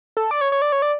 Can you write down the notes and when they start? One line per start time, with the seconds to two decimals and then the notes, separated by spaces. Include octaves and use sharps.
0.17 A4
0.31 D5
0.41 C#5
0.52 C#5
0.62 D5
0.72 C#5
0.82 D5